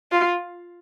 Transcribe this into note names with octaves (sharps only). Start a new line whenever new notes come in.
F4